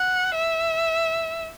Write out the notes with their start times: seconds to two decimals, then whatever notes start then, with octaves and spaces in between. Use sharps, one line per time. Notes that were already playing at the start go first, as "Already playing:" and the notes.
Already playing: F#5
0.35 E5